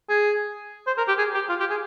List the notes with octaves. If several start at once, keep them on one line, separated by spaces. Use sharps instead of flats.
G#4
C5
A#4
G4
G#4
G4
F4
G4
G#4